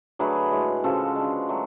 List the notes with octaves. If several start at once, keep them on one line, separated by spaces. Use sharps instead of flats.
D3 F#3 A3 G#4 B4
A2 G#3
C#3 F3 G#3 F#4 A4
D3 G#3
F#3 A3